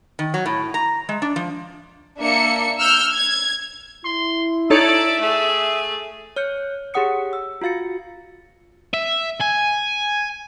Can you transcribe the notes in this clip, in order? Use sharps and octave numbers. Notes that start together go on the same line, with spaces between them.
D#3
F#3
A2
A#5
G#3
D4
F3
A#3 D4 E5 C#7
E6 F6 G6
G#6
E4 C6
D#4 A4 C#5 D5 E5 A5
A3 G#4
C#5 F6 G6 C#7
G4 G#4 C#5 F#5 D#6 C#7
E6
F4 F#4 F5 A6 C#7
E5
G#5